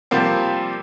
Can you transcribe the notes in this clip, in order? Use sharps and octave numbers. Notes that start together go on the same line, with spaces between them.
C3 F3 G3 A#3 C4